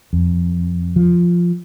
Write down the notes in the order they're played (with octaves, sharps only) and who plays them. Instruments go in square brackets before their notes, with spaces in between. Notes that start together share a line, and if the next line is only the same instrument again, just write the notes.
[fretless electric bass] F2
F3